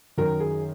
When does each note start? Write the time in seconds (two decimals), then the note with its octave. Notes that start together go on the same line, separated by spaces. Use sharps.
0.18 F#2 D#3 F#3 A#4
0.40 G#4